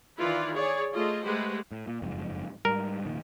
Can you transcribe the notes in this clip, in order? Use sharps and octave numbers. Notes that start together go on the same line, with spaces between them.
D#3 E3 E4 F4 B4 D5
G#4 C#5 D5
A3 F4 G#4 A4 D#5
G#3 A3 G4 B4 C5 F#5
A2
A#2
F#1 F2 G#2
G#2 G3 A#4
F1 A#2 D#3